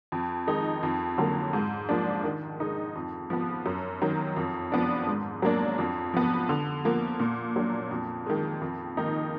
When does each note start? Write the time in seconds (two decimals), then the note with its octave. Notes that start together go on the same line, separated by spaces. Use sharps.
0.12 F2
0.47 D#3 G#3 D#4
0.83 F2
1.18 D3 F#3 A#3
1.53 G#2
1.89 F3 A#3 D4
2.24 D#3
2.60 G#3 D#4
2.95 F2
3.30 F3 B3
3.66 F#2
4.02 D#3 F#3
4.36 F2
4.72 F3 B3 D4
5.07 G#2
5.42 F#3 A#3 D4
5.78 F2
6.14 F3 B3
6.49 D3
6.85 F3 A#3
7.20 A#2
7.56 F#3 D4
7.91 F2
8.26 D#3 G#3
8.61 F2
8.97 D#3 A#3 D#4